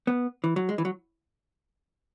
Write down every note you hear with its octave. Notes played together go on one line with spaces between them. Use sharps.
B3
E3
F#3
G#3
E3
F#3